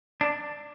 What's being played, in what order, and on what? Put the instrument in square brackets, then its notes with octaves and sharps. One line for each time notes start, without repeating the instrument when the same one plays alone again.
[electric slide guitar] D4